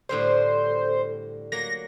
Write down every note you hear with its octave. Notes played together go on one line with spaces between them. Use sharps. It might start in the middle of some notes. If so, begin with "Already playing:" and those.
A2 D3 G3 C5
F#3 A#3 A#6